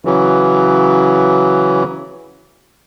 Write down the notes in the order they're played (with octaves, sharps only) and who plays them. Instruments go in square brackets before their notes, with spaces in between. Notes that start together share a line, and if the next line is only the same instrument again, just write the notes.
[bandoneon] C#3 E3 F#3